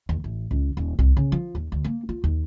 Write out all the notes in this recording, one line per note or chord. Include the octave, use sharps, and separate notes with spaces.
D#2
A1
C#2
D#1
C2
C#3
F3
D#2
D2
A#3
F4
D#2